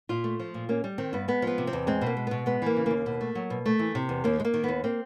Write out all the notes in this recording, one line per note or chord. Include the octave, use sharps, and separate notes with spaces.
A#2 F4
A3
F3
A#2
A#3 C#4
G3
D#3 C4
G2 B3
G#3 B3
F3 B3
C3
C4
E2
G#3 C4
B2
A#3
G#3
B2 B3
G#3 B3
E3 A#3
C#3
D#2 A#3
B2
A3
F#3
B2
A3
E3
C3
E2
D#2 A#3
G#3
A#3
D#3
D#2 B3
A#3 C4